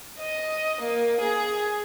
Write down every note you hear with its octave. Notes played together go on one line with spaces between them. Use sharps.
D#5
A#3
G#4